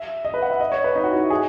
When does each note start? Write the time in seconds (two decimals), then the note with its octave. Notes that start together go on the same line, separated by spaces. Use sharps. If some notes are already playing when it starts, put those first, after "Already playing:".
Already playing: E5
0.25 D#5
0.34 B4
0.42 F#5
0.51 E5
0.60 D#5
0.72 C#5
0.84 B4
0.95 D#4
1.04 F#4
1.13 E4
1.30 G#4